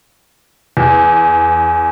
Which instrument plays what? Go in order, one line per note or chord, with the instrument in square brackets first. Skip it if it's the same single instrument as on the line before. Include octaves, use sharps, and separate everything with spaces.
[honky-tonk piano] E2